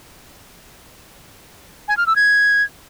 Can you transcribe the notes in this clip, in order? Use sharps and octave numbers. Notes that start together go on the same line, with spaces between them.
G#5
F6
E6
G#6